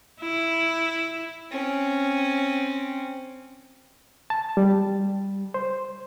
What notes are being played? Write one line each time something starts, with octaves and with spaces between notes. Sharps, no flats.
E4
C4 C#4
A5
G3
C5